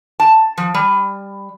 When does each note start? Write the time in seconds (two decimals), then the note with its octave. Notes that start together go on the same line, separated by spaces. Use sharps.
0.20 A5
0.58 F3
0.74 G3